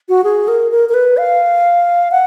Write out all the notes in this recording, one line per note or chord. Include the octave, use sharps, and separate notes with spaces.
F#4
G#4
A#4
A#4
A#4
B4
F5
F#5